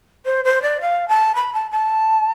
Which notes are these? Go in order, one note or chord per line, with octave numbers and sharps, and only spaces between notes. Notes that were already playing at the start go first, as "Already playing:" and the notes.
C5
C5
D5
F5
A5
B5
A5
A5